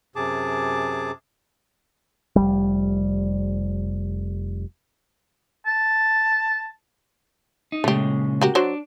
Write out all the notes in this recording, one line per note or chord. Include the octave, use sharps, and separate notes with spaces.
F#2 C3 G#4 A5 D6
F1 B1 G3
A5
D#4
A#2 C#3 G#3 A3 G4
F#4 G4 A#4
F#3 D4 F#4 C5